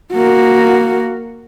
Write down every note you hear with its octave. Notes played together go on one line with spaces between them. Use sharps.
A#3 F#4